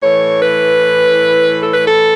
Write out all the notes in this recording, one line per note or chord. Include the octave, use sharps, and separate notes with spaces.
A2 E3 C#5
B4
A4
B4
A4